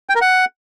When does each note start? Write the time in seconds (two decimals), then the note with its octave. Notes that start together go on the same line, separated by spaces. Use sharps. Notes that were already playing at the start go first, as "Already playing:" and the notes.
0.09 G5
0.15 A#4
0.21 F#5